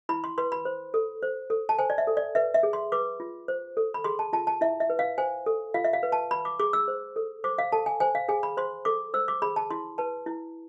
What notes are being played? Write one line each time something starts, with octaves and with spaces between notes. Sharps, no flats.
E4 B5
C6
B4 C6
B5
C5
A4
C5
A4
A5
C5 G#5
D5
E5
A4
D5
B4 E5
E5
G#4
C6
B4 D6
F4
C5
A4
B5
G#4 C6
A5
F4 A5
A5
E4 E5
E5
B4
F5
C5 G#5
A4
F4 F5
E5
F5
B4
A5
B4 B5
D6
G#4 D6
E6
C5
A4
C5 D6
F5
A4 A5
G#5
C5 G#5
F5
G#4 G#5
B5
C5 C6
A4 D6
C5 E6
D6
G#4 B5
A5
E4 C6
B4 A5
E4